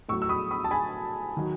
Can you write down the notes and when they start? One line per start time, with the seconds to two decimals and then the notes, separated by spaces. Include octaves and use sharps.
0.09 A2 F#3 C#6 E6
0.22 E6
0.29 B5 D#6
0.51 B5 D#6
0.64 A5
0.71 G#5 B5
1.37 D#3 F#3